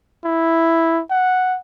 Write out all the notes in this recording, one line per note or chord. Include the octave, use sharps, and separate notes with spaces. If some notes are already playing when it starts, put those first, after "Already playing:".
E4
F#5